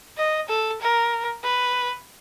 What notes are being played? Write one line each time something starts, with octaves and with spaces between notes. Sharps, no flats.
D#5
A4
A#4
B4